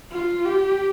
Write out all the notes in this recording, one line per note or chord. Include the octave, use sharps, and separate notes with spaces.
F4
G4